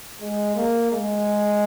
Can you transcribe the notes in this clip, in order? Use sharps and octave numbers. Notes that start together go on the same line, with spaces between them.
G#3
A#3
G#3